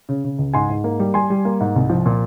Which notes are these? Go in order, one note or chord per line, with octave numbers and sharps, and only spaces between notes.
C#3
C#3
C#2
G#2 G#5 C6
G#2
A#3
G3
G3 G#5 C6
G3
A#3
G#2
C2
F3
A#2